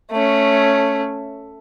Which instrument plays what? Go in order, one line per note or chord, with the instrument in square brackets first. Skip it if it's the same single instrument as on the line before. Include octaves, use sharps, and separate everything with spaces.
[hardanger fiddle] A3 C#4